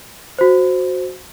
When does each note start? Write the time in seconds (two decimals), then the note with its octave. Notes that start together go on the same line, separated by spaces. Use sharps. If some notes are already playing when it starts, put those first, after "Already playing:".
0.39 F#4 C5